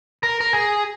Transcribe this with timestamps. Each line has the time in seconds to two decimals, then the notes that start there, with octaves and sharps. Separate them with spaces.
0.23 A#4
0.41 A#4
0.53 G#4